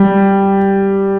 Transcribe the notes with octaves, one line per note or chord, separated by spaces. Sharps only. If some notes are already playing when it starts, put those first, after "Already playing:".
Already playing: G3